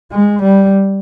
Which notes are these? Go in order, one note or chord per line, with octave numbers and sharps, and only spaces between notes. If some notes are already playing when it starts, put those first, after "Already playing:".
G#3
G3